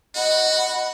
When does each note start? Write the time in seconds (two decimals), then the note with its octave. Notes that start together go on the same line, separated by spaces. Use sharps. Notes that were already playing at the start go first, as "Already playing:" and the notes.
0.15 F#4 D#5 F#5 B5